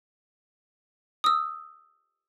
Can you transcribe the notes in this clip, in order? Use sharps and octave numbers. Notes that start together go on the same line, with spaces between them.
D#6 E6